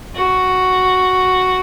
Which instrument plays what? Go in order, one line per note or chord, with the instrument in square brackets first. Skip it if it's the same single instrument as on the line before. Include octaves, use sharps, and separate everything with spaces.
[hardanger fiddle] F#4